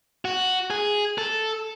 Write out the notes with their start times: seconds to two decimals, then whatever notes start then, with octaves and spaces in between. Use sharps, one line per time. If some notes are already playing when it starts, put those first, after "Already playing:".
0.25 F#4
0.70 G#4
1.18 A4